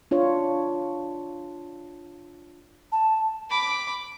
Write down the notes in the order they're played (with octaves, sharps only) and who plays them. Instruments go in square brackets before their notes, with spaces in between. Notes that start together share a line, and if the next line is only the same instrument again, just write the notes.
[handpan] D4 F4 C#5
[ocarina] A5
[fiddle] B5 D6